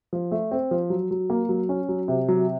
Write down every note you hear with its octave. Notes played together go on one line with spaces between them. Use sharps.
F3
A3
C4
F3
F#3
F#3
A#3
F#3
C#4
F#3
C3
F#3